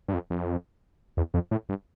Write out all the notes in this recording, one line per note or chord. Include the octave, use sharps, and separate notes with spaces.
G2
F2
F2
E2
F2
A2
G2